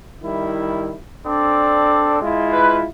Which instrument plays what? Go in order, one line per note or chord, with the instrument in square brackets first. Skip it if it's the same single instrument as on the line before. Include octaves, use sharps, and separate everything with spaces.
[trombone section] D#3 G3 E4
[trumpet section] C4 D5 [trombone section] D4 A4
[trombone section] G#3 E4 F4
[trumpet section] B4